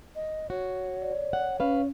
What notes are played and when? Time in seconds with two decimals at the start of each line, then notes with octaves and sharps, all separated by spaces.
0.16 D#5
0.50 F#4 C#5
1.02 D5
1.33 F#5
1.60 C#4 B4 F5